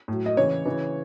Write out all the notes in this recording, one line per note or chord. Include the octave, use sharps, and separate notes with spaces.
A2 F#3
D#5
C#3 E3 C#5
C#3 E3